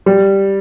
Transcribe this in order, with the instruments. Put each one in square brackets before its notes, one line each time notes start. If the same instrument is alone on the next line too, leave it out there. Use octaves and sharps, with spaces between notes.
[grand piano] G3